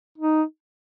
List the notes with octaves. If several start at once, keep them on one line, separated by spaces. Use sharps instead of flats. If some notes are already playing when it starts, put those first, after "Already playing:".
D#4